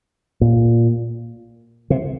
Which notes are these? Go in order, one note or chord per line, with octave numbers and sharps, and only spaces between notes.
A#2
C3